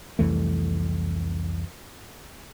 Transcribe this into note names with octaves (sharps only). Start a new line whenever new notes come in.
C2 F2 E3 A3